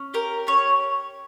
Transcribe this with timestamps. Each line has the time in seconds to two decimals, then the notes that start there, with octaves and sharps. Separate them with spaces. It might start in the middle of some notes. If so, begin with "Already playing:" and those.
Already playing: C#4
0.14 G4 A#4
0.47 C#4 C#5